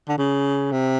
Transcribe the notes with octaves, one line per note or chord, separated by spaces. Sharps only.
D3
C#3
C3